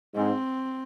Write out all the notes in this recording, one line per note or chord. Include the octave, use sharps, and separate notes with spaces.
G#2 C4